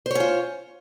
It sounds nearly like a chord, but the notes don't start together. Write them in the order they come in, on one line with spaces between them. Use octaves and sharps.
C5 C#5 C#4 F4